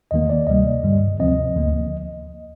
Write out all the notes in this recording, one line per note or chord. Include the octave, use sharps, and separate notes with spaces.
D#2 D#3 A#3 D#5
D5
D2 C3 G3 A#3 D#5
G2 D3 G3
D2 C3 F3 C4 D#5
D2 D3 F3 A#3